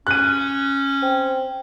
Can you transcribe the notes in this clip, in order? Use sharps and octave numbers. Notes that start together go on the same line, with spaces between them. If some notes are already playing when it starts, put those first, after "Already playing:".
C#4 F#6 D#7
C4